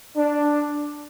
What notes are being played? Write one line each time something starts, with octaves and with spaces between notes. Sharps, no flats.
D4